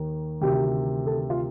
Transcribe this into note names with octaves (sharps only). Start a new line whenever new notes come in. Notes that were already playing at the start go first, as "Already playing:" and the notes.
Already playing: D#2 D#3
D2 C3 D#3 G4
A4
F4